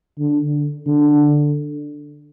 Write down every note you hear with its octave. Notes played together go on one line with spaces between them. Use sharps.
D3
D3